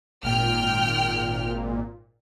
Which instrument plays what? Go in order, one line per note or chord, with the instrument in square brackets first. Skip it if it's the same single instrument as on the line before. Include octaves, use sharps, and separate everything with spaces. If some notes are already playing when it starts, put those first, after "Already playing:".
[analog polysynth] G#1 A#2 [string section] G5 F6